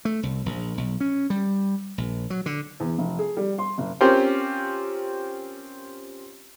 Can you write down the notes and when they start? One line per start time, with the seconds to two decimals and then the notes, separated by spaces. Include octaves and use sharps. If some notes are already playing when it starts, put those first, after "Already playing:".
0.05 A3
0.23 C2
0.46 A#1
0.77 B1
1.00 C#4
1.30 G3
1.98 A#1
2.30 F#3
2.46 D3
2.80 E2
2.98 F1
3.19 G#4
3.37 G3
3.58 C6
3.78 F#1
4.01 C4 C#4 F4 G4 A#4 C5